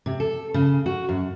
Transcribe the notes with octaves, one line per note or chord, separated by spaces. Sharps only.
C3
A4
C#3
F#4
F#2